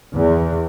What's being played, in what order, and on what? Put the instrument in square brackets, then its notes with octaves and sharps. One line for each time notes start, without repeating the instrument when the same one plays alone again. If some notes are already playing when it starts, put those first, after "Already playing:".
[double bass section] E2